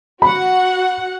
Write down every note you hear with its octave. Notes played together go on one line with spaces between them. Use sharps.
F#4 F#5 B5